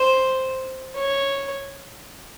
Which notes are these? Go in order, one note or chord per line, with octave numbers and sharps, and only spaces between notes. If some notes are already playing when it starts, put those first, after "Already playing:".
Already playing: C5
C#5